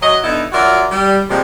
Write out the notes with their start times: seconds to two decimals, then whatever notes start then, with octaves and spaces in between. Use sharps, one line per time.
0.02 F#3 D#5
0.24 D3 B3 D#4 E4
0.52 F#3 F4 F#4 A#4 D5 E5
0.91 G3
1.30 C3 F3 G3 G#3 A#3